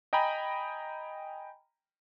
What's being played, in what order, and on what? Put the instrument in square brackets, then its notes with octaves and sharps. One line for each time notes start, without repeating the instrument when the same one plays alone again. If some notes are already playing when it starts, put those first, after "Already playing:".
[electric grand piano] D#5 G5 G#5 A#5 B5